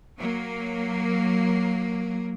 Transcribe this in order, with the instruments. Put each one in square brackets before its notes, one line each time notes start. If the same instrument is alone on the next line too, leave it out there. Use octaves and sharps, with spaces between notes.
[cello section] F#3 A#3